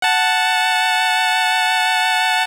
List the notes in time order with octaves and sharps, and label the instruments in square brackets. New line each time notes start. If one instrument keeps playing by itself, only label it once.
[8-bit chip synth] F#5 A5